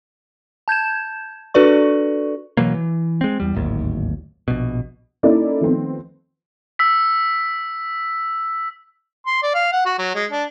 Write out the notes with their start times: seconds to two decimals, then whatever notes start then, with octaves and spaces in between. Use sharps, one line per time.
0.68 A5 G6 G#6 E7
1.54 D4 F#4 A4 B4 D5 C#6
2.57 B2 E3 F#3 A#3
2.74 E3
3.21 G#3 C4
3.40 E2 G3
3.55 D1 G#1 D#2
4.48 A#1 B2
5.23 A#3 C#4 D#4 E4 A4 D5
5.61 D#3 F3 A3 B3 C4
6.79 E6 B6
9.26 C6
9.43 D5
9.55 F5
9.72 F#5
9.86 F#4
9.99 F#3
10.15 G#3
10.32 D4